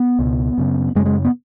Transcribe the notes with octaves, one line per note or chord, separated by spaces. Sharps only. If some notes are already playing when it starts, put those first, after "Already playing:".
Already playing: B3
C#2 B2
F#2 C#3
F#2 C#3 G#3
G#3
B3